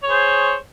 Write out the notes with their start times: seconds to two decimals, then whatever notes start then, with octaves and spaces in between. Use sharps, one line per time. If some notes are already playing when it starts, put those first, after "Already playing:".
0.03 C#5
0.06 G#4
0.10 C5